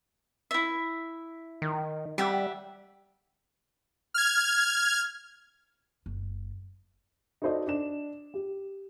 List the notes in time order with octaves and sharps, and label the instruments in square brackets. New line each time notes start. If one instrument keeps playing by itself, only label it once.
[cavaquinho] E4 E5
[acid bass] D#3
[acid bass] G3 [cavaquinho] G4 E5 F#5
[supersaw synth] F6 G#6
[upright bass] F#1
[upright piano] D#4 F#4 A4 C5 D5 D#5
D4 E7
G4